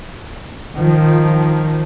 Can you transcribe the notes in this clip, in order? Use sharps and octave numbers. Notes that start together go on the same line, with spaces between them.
D#3 F3